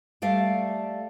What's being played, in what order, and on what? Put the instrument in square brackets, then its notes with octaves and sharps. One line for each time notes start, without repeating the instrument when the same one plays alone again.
[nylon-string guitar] G3 A3 D5 E5 F5